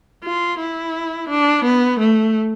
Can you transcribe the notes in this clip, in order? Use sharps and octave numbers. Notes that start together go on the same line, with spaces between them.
F4
E4
D4
B3
A3